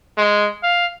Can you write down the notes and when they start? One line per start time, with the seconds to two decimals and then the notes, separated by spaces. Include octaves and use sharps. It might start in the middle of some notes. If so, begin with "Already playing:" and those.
0.17 G#3
0.63 F5